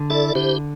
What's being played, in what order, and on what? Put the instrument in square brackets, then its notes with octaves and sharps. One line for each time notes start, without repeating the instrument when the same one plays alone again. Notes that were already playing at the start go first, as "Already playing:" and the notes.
Already playing: [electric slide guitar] D3
[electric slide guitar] E4 [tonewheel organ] A4 D5
[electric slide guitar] D3 [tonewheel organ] G4 C5